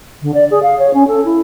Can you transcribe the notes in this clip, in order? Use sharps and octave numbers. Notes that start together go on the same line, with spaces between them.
D3
D5
G#4
F5
C#5
C#4
A4
E4